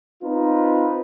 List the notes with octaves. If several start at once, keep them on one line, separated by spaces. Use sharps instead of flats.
C4 D#4 F4 B4